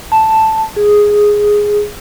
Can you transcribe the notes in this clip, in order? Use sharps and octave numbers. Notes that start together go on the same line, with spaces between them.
A5
G#4